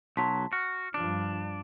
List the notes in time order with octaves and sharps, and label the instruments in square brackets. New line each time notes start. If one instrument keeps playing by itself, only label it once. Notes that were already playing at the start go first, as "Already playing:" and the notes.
[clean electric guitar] B1 F#3 [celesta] A5 C6 B6
[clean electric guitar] F#4 [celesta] F6
[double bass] G2 F3 [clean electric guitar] D4